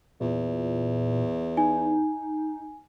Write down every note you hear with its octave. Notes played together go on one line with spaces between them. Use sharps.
E2 A#2
D#4 G#5